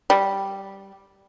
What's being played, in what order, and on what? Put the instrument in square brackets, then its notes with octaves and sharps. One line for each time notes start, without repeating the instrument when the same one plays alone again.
[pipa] G3